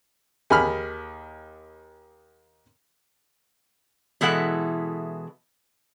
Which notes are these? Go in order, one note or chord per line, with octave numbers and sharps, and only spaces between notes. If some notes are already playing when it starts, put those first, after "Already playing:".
D#2 G#4 B5 F6
B2 E3 G#3 E4 A4 F#5